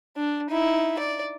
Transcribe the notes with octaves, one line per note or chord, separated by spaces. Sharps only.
D4
D#4 E4
D5